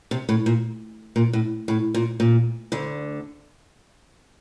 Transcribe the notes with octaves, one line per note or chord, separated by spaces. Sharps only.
C3
A2
A#2
A#2
A2
A2
A#2
A#2
D2 D3